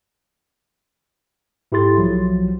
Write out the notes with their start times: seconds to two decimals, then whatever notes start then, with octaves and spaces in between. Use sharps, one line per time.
1.72 G#2 E4 G4 A4 C6 A6
1.97 B1 F3 F#3